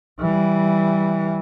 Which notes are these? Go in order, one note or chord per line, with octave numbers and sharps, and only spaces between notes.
E3 G3